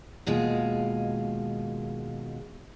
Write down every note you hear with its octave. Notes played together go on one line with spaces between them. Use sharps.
D#2 B2 G#3 F4